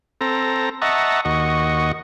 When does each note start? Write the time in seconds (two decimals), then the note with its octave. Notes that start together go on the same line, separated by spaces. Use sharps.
0.21 C4 A4 A#5
0.82 D#5 E5 F#5 A5 A#5 C#6
1.25 D#2 F#4 D#5 C#6